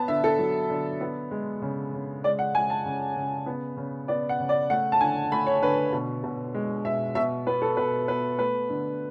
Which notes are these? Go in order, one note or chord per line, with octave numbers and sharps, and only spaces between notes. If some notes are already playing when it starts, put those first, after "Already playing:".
Already playing: B3 A5
D3 E5
A4
F#3
D3
B3
G#3
C#3
C#3
G#3 D5
F#5
G#3 G#5
A5
C#3
C#3
B3
C#3
B3 D5
F#5
C#3
D5
A3 F#5
A5
D3 G#5
A3 B5
C#5
D3 B4
B2
B2
G#3
B2 E5
B2 E5
B3 B4
A4
B2 B4
B3 B4
A3 B4
D3